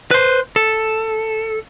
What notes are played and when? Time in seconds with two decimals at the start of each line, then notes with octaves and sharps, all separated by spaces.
0.11 B4 C5
0.56 A4